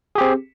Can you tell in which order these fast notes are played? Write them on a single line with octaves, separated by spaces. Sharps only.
G#4 G4 C4